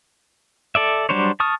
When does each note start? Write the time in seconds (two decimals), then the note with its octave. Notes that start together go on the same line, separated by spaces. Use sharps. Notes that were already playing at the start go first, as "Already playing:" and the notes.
0.75 A4 D5 E5
1.09 F#3 G3 D4 C5 C#5
1.40 A5 C#6 D#6 F6